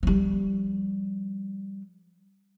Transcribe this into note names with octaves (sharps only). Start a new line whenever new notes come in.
F3 G3